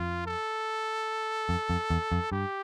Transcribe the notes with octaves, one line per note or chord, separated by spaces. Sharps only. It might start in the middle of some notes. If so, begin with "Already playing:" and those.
Already playing: F2 F4
A4
F2
F2
E2
F2
G2 G4